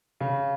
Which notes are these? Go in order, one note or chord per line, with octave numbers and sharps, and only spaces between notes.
C#3